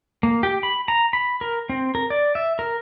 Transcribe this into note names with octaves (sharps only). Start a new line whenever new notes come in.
A#3
G4
B5
A#5
B5
A#4
C4
A#4
D5
E5
A#4